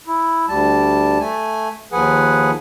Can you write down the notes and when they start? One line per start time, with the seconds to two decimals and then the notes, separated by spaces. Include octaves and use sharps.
0.07 E4
0.48 D2 G3 A5
1.20 A3 G#5
1.92 D#2 F3 G#4 B4 F#5 G#5